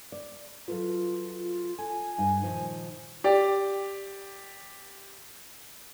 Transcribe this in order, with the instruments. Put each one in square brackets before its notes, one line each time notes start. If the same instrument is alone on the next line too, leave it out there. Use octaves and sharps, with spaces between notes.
[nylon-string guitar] D5
[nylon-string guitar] F#3 A4 B4 [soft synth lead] F4
[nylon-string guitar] A4 [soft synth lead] G#5
[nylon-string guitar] G2 D#4
A#2 D#3 F3
[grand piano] G4 D5